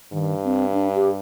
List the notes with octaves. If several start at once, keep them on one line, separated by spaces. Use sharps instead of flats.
G2 D#3
C4
D4
G4